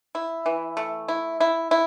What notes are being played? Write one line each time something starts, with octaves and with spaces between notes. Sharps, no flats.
E4
E3
A3
E4
E4
E4